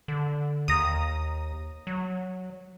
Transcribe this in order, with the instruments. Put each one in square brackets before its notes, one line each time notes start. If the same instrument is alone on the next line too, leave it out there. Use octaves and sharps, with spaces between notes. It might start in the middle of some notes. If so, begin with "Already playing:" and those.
[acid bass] D3
[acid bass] D#2 [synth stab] A#5 D#6
[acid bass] F#3